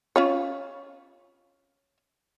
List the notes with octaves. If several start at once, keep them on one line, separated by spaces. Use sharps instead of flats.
C#4 F4 C#5